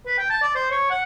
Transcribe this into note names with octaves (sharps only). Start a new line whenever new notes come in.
B4
G5
A5
D5
C5
C#5
F#5